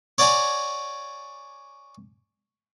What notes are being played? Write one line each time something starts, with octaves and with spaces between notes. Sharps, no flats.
C#5 D5 F#5 G#5 A#5